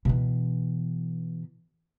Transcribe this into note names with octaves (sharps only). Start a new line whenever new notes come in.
B2 E3